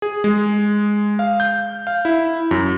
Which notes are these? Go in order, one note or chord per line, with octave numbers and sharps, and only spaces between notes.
G#4
G#3
F5
G6
F5
E4
F#2